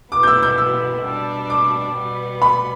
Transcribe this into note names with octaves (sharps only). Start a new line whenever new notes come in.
B2 B3 E4 D6
G6
E6
G6
E6
B2 G3 D4
D6
B2 G3 B3
B5